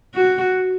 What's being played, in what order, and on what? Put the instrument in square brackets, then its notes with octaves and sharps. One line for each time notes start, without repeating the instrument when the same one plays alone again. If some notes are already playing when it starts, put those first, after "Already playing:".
[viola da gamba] F#4